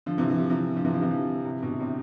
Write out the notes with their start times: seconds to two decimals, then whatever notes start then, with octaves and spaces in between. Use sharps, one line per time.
0.06 D3 F3
0.18 C3 E3
0.30 E3
0.40 F3
0.50 C3 E3
0.76 D3 F3
0.84 C3 E3
0.93 D3 F3
1.01 C3 E3
1.11 D3 F3
1.45 C3 E3
1.62 B2 D3
1.80 A2 C3